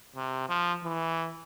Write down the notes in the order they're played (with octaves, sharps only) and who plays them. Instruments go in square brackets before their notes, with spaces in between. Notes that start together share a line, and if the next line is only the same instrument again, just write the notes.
[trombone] C3
F3
E3